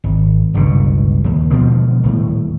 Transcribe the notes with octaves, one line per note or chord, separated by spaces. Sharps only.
G#1
G1 C#2 B2 D3
D#2
B2 D3 F3 G#3
D#1 A2